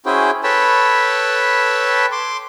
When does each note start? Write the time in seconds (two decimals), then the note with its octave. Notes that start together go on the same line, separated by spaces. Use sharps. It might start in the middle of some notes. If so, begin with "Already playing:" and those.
0.06 C#4 E4 F#4 G#4 C5 G5
0.44 A4 B4 C#5 G5 A5 B5
2.12 C6 D6